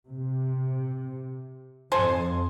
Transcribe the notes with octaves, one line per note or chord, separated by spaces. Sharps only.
C3
F2 A4 C5 G#5